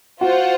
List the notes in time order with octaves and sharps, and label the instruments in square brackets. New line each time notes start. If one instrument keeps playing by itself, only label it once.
[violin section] F4 C5 F#5 [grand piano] F#4